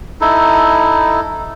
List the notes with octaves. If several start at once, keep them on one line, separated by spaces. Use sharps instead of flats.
D#4 E4 A4